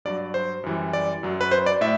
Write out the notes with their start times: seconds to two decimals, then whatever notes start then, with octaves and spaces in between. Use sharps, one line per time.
0.05 G2 F#3 D5
0.34 C5
0.64 F#2 E3 G3
0.93 D5
1.23 F#2 F#3
1.41 B4
1.51 C5
1.66 D5
1.81 A2 E5